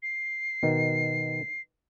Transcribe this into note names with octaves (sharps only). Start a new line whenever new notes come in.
C7
B2 D#3